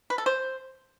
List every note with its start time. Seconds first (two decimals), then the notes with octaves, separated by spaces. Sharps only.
0.10 B4
0.18 A4
0.26 C5